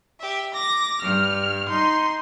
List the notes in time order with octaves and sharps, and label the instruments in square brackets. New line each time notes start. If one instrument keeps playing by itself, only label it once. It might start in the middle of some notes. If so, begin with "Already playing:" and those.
[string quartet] G4 E5
[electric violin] D6 [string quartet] A#6
[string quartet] G2 [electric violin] F6
[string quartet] D#4 [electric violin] C6